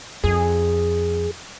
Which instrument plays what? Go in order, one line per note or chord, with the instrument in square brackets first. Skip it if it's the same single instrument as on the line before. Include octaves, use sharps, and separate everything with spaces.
[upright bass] F2 [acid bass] G#4